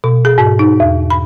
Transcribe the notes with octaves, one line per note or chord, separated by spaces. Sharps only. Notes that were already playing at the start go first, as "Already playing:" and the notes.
B2
G#4
G#2
D#4
E2
B5